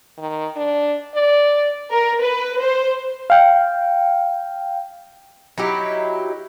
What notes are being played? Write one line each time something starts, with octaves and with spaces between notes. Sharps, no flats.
D#3
D4
D5
A#4
B4
C5
F5 G5
F#3 D#4 E4 G4